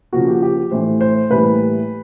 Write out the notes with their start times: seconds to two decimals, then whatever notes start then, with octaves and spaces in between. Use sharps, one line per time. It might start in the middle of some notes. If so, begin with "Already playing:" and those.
0.13 C#3 F3 A#3 F#4
0.28 G4
0.42 G4
0.71 A2 E3 A3 C5
1.01 C5
1.30 A2 E3 G3 A#3 B4